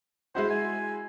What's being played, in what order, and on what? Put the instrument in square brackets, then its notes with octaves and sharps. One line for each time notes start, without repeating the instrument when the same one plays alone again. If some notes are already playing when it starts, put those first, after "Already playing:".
[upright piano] G#3 E4 F#4 [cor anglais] C5
[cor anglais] G#5